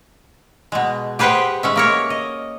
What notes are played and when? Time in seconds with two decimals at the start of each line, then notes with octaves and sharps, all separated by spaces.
0.72 B2 G#3
1.19 G4 G#4 B4 C5 F#5 G5
1.63 G#3 C#4 E5
1.76 A#3 A#4 C#5
2.10 D#5